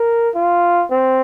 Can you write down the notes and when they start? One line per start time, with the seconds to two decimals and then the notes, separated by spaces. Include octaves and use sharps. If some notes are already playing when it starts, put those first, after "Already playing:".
Already playing: A#4
0.35 F4
0.91 C4